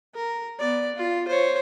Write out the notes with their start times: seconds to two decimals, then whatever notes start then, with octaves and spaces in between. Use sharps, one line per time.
0.15 A#4
0.59 B3 D5
0.96 F4
1.28 C5 C#5